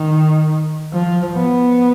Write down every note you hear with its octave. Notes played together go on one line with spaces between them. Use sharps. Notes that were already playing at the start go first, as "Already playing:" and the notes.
Already playing: D#3
F3
B3